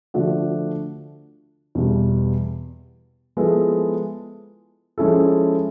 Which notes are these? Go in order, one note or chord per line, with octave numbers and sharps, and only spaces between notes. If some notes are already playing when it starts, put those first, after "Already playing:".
D3 F3 A3 D4 F#4
E2 B2 G3
F3 G#3 B3 E4 A4
F3 G#3 C#4 E4 A4